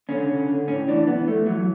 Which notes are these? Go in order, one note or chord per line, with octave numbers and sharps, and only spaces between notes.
D3 C#4
D3
D3
A2 C#4
E3 D4
E3 B3
E3 A3
E3 F#3